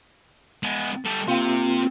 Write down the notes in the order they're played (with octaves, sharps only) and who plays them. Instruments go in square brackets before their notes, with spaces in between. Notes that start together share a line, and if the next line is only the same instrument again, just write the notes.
[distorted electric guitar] G#3 B3
G3 A4
[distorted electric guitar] C3 [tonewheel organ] A#3 C4 F4